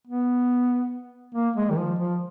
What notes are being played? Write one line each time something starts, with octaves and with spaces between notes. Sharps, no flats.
B3
A#3
G#3
D#3
F3
F3